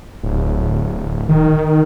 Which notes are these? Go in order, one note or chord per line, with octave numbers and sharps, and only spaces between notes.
D1
D#3